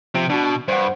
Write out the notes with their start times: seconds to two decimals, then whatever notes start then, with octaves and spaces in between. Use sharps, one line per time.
0.14 C3 F3
0.30 B2 D4 F#4
0.68 G2 C5 F#5